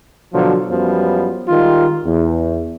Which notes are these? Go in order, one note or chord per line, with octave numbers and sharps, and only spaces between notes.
B2 D3 F3 F#3
F#2 F3 G3 B3
D#3 G3 G#3 F4
E2